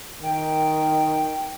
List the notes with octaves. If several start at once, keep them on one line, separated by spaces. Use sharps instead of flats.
D#3 G5